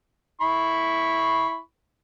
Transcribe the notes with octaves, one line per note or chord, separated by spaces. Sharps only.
E4 B5 C#6